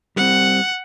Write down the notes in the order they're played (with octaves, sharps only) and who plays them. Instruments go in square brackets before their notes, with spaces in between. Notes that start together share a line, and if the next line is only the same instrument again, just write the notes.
[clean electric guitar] G3 C4 [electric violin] F#5